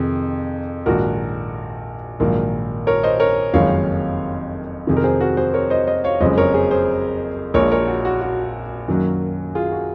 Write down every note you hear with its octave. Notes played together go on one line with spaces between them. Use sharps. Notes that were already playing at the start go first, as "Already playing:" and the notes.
Already playing: F2 C3 D#3 G#4
A#1 G#2 D#3 F#4 A#4
A#1 G#2 D#3 F#3 A#3
A#4 C#5
C5 D#5
A#4 C#5
F#1 F2 D#3 G#3 C#5 F5
F2 C3 D#3 G#4
A#4
G#4 C5
F#4 A#4
G#4 C5
A#4 C#5
C5 D#5
C5 D#5
C#5 F5
F#1 F2 C#3 G#3 C5 D#5
A#4 C#5
G#4 C5
G#4 C5
A#1 A#2 G#3 A#4 C#5
A#4 C#5
F#4
F#4
F#4
F#2 D#3 F#3 A#3
F4 G#4
F#4